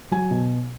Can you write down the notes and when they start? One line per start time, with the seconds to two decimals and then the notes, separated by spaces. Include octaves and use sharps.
0.11 F#3 G#5
0.31 B2